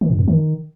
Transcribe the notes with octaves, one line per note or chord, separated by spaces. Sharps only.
D#3
G2
F2
D#3